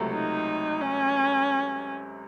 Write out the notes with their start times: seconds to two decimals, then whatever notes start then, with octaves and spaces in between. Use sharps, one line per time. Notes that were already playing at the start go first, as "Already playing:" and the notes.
Already playing: C#2 C3 F#3 A3
0.12 D#4
0.81 C#4